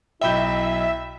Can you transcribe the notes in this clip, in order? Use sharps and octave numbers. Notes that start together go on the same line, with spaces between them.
B1 E4 D#5 E5 G5 B5 G6 G7